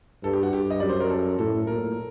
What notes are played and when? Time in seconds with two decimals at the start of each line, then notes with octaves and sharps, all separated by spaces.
0.24 G2 A4
0.33 G4
0.43 F#4
0.52 G2 G4
0.70 D#5
0.80 F#2 D5
0.89 C5
1.00 A#4
1.10 A4
1.39 A2 A4
1.67 A#2 A#4